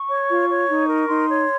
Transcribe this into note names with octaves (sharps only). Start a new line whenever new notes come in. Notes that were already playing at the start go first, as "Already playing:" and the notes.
Already playing: C#6
C#5
F4
C#5
D#4
A#4
D#4 C6
C#5